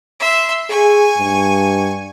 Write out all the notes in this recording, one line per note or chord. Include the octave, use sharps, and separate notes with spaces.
E5 C6
G#4 G#5 C#6
G2